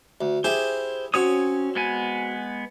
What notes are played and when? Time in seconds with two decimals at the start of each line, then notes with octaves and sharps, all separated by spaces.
0.21 D2
0.44 E4 G4 G#4 C5
1.14 C4 C#4 F#4 C#5 D#6
1.75 G#3 B3 G#5